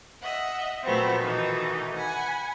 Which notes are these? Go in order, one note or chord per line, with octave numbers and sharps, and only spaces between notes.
D#5 E5 F#5
A#2 F3 F#3 A3 B3 C4
B2 D#3 E3 A3 D#4
F#5 G#5 B5